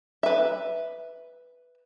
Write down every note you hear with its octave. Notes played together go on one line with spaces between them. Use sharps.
B4 E5